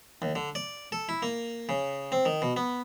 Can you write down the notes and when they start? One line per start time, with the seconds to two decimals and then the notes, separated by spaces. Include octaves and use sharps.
0.22 D#2
0.36 D3
0.55 D5
0.92 A4
1.09 E4
1.23 A#3
1.69 C#3
2.12 C4
2.26 D#3
2.42 B2
2.57 B3